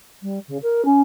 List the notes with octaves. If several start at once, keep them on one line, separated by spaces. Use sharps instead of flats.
G3
C#3
A#4
C#4